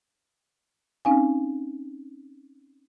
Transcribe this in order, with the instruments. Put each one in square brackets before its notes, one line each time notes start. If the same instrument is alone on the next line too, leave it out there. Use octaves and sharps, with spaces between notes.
[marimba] C4 C#4 D#4 F5 G#5